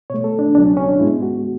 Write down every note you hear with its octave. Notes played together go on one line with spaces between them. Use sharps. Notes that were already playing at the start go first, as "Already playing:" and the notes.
B2 A3 C#5
A4
D4
C#2 B2 F#3 D4
C#4
C#4
D4
G#2 G#3 B3 E4
F#4